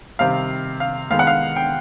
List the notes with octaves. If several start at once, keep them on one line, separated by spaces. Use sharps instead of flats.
C3 D#3 G3 C4 F5
F5
D#3 G#3 B3 F5
F#5
F5
G5